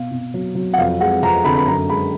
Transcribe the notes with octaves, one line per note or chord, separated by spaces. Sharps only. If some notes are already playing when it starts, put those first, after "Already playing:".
Already playing: B2 F5
B2
F#3
F#3
F#5
F2 F5
G#3 F#5
F2 A#5
D3 B5
B5
F#2 A#5
G#3 B5